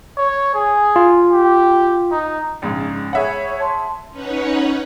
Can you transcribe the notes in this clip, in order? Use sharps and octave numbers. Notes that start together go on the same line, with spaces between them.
C#5
G#4
F4
G4
D#4
A#1 G#2 C#3
G#4 C#5 E5 F#5 B5
A5 C6
C#4 D#4 B4 C#5 F#5